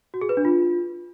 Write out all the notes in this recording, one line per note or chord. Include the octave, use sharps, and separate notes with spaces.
F#4
G#4
B4
D4
F4